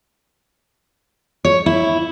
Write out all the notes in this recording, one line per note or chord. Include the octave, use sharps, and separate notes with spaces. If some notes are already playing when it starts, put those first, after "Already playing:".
C#5
E4